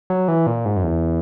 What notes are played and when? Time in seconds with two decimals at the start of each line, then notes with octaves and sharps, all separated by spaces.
0.10 F#3
0.28 E3
0.47 A#2
0.65 G#2
0.76 F#2
0.84 E2